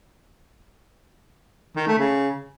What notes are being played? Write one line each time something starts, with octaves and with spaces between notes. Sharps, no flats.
D#3
A3
C#3